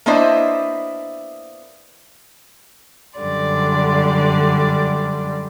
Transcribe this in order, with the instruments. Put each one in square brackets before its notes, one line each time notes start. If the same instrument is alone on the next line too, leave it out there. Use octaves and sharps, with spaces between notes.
[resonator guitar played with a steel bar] A#3 B3 D4 E4 C5 D#5
[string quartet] F#2 D3 G3 D5 C6